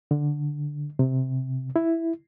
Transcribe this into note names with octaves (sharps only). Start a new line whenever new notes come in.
D3
C3
E4